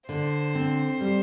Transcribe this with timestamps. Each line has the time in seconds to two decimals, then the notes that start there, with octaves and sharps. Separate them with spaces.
0.08 D3 C5
0.55 C4
1.01 G3